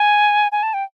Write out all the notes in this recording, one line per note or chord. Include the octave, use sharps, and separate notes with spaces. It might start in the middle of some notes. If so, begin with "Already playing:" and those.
Already playing: G#5
G#5
A5
G5